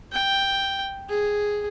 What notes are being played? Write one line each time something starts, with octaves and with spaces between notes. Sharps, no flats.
G5
G#4